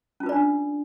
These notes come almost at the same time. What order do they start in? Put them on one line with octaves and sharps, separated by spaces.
C#4 F4 B4 D5 D4